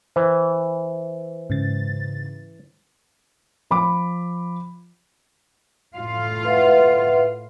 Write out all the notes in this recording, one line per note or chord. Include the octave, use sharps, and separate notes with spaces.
E3 C5
G#2 C#3 A6
F3 B5 D6
A2 F4 F5
B4 E5 F#5